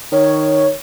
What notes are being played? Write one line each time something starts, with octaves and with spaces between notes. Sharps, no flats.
D#3 C#5